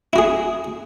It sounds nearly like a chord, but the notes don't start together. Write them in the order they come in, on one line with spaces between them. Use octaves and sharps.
E4 F#4 G#4